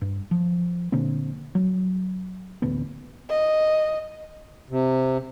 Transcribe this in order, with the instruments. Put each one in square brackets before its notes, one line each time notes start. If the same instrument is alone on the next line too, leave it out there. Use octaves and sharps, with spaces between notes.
[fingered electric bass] G2
F3
A#2 D3 A#3 C4
F#3
D1 A1 D2 B3
[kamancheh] D#5
[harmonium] C3